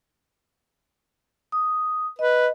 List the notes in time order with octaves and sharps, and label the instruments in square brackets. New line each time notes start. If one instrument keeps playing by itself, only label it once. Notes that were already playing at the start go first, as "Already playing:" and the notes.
[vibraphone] D#6
[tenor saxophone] B4 [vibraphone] D#5